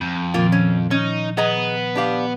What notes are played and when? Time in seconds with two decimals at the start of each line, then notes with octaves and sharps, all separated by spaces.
0.01 F2 G6
0.34 A#2 D#3 F3 A#3 F4
0.52 C#4
0.91 C#4 D#4
1.37 B3 G#4 D#5 A#5
1.95 D4 G4 F5